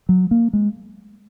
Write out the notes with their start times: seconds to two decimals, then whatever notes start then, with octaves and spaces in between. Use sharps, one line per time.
0.09 F#3
0.31 A#3
0.53 G#3